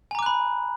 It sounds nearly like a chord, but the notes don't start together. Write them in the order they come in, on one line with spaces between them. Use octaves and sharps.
G#5 A#5 D6 F#6 B5